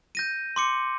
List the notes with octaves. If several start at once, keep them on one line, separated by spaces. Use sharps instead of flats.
G6 A#6 D#7
C6 D6 C#7